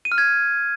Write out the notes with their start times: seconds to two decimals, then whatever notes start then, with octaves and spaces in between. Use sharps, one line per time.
0.05 D#7
0.12 F6
0.18 G#6